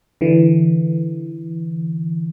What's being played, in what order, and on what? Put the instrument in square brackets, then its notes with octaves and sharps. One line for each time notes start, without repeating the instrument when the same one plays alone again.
[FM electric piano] D3 E3